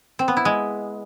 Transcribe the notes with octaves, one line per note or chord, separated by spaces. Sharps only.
C4
B3
E4
G#3